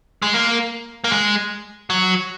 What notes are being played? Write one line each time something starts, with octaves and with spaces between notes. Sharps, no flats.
G#3
A#3
A#3
G#3
F#3